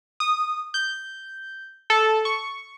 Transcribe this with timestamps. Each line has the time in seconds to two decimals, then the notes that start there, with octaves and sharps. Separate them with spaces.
0.20 D#6
0.74 G6
1.90 A4
2.25 C#6